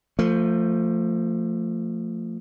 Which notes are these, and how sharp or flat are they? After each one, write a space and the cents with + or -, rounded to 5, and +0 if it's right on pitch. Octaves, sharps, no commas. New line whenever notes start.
F3 +0 A3 +30